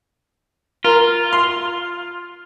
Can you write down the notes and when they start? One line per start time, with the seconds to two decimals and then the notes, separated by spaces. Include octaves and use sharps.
0.84 F4 A#4
1.33 C6